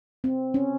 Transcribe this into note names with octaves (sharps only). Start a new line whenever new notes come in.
C4
C#4